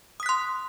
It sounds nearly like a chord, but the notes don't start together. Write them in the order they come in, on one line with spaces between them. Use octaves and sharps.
D#6 B6 F#6 C6